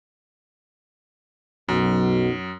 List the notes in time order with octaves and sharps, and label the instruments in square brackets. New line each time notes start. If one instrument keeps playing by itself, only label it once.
[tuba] B1 [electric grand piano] F#2